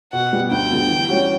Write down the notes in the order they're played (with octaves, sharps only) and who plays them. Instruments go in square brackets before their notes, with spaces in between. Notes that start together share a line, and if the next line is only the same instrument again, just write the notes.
[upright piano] B2 [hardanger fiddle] F#5
[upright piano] G3 B3
[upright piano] D2 [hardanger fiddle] G5
[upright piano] D3 G3 B3
E3
G3 C#4 F#4